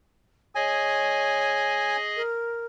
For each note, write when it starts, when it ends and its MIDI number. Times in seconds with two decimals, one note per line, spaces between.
0.55 2.22 68
0.55 1.98 73
0.55 2.22 75
0.55 1.96 80
2.16 2.66 70